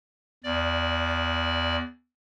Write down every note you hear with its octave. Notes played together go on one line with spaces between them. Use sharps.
E2 D5